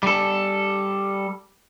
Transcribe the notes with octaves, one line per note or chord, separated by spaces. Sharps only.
G3 A4